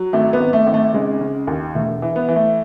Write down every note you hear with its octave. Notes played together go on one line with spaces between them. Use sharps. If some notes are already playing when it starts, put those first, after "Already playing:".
Already playing: F#3
G#1 A3
B3
G#1
A3
G#1
A3
C#3 G#3
C#3
D#2
E1 A3
E3
B3
E3
A3